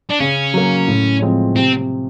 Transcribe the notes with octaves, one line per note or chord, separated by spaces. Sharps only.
D4
C#3 C#4
F#3 A#3
A2
F3 G#3 C4
C3 C4